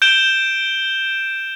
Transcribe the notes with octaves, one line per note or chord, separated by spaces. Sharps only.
G6 D7 E7 G7